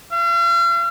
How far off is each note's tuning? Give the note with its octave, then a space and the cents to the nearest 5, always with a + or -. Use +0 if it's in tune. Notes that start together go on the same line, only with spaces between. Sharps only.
F5 -40